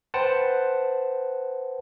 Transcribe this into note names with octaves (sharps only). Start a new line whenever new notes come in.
B4 C5 F#5 G5 A5